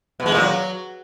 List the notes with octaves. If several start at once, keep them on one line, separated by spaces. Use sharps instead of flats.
B2
G#3
A#2
F#3